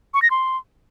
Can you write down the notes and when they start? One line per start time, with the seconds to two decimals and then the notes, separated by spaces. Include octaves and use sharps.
0.14 C#6
0.22 A#6
0.31 C6